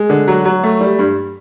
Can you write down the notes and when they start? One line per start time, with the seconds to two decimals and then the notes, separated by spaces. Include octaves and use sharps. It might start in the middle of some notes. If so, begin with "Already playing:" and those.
Already playing: G#3
0.09 D3
0.28 F#3
0.45 F#3
0.63 A3
0.81 G3
0.99 G2